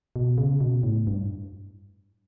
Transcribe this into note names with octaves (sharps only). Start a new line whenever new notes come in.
B2
C#3
B2
A2
G2